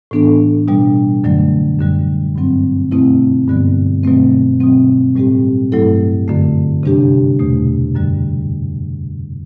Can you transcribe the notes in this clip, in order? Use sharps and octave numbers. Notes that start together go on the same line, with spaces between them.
A2 E3 B3 D4 A4
B2 G3 D4
F#2 D3 F#3 A3
F#2 D3 G3
G2 F#3 C4
B2 A3 C4 E4
G2 D3 G3 B3
B2 F#3 A3 C4
B2 F#3 C4
A2 G3 C4 G4
G2 F#3 A3 E4 A4
F#2 D3 A3
C3 G3 D4 G4
E2 B2 A3
F#2 D3 G3